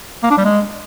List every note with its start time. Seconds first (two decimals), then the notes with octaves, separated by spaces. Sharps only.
0.23 A#3
0.30 D4
0.37 G3
0.45 G#3